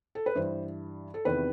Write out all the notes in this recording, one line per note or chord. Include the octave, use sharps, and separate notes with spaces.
A4
B4
G2 E3 C5
A4
E2 C3 D#3 B4